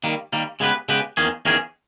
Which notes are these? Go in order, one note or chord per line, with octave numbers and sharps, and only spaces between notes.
D#3 G3 A#3
D#3 G3 A#3
C#3 G#3 B3 G4 B4
C#3 G#3 B3 G4 B4
E2 D#3 A#3 C#4 G#4
E2 D#3 A#3 C#4 G#4